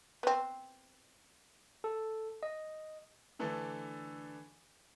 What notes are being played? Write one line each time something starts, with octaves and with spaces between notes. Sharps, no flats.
B3 C4
A4
D#5
D3 E3 A3 D4 A4